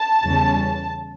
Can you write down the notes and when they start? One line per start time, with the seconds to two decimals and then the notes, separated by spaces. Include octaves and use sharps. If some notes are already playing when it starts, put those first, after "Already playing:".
Already playing: A5
0.23 E2 C#3 G3 C#4